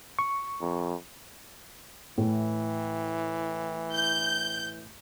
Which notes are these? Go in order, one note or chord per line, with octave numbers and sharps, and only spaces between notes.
C#6
F2
A2 E3
G6